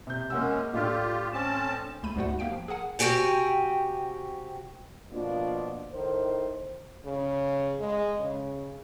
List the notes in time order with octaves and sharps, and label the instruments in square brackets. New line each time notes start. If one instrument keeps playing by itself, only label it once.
[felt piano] C3 G6
[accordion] F#2 G#3 C#4 [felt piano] A#3 F#5 E6
[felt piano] A2 D4 F6 [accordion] F4 G4
[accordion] C4 C#4 A5
[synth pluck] C#2 A3 B5 D#7
D2 G#2 G3 A3 F#4 F#5
A#3 G4 F5 G5 D7
F3
G#4 A#4 F#5 G#5
[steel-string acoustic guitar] C3 F#4 G4 G5 G#5
[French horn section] B2 F3 A#3 D4 F4
A2 D#3 C5
[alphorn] C#3
G#3
C#3